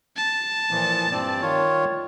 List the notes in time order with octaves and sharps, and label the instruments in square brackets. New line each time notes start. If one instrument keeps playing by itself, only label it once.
[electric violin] A5
[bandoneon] A#2 E3 F3
G2 C4 D5
D#3 F4 C#5